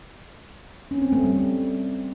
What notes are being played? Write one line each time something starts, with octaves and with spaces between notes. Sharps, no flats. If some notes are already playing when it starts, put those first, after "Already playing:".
C#4
C4
A3
G3